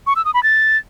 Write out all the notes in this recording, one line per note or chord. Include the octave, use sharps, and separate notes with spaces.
C#6
E6
D#6
B5
A6